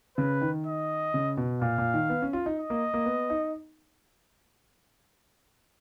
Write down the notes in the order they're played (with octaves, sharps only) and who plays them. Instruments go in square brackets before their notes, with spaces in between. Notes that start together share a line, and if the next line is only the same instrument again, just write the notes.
[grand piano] C#3 [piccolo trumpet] B4
[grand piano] D#3
[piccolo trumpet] D#5
[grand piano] C#3
B2
[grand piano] A#2 [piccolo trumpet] F5
[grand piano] A#2
D#3
B3
C#4
F4
D#4
[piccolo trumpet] D#5
[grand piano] A#3
A#3
B3
D#4